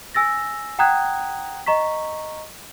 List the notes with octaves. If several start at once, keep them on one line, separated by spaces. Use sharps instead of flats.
G#5 E6 A6 A#6
F#5 G5 A#5 D#6 F#6 G#6
D#5 A#5 C#6 B6